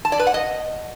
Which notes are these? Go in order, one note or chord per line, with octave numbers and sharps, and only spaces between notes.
A5
D5
B4
F#5
D#5